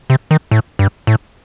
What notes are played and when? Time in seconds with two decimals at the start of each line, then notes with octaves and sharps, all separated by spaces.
0.10 C3
0.31 D#3
0.51 A2
0.79 G2
1.07 A2